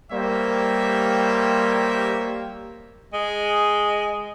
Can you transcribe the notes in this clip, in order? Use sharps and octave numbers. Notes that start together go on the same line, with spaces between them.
G3 A#3 G4 C5 C#5 E5
G#3